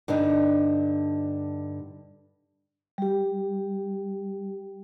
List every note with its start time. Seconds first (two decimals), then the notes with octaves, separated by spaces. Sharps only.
0.08 G2 D3 D4 D#4
2.98 G3 G4